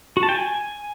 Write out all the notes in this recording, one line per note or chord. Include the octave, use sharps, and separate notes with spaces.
F#4
A5
G5
G#5